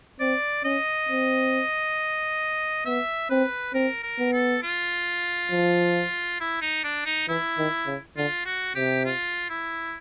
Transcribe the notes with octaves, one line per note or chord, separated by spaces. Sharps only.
C4 D5
C#4 D#5
C4
B3 E5
C4 B4
C4 A#4
A#4
B3
A4
F4
F3
E4
D#4
D4
D#4
E3 E4
D#3
C#3
D3 F4
F#4
C3 G4
F4
E4